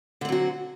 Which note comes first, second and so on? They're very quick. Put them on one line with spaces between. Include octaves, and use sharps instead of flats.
D3 C4 F#3 F#4